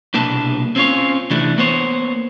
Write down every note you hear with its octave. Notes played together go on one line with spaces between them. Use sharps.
C2 B2 A#3 D4 B4 A5
C4 C#4 F4 C#5
C3 E3 A3 D4 E4
A#3 B3 C5 C#5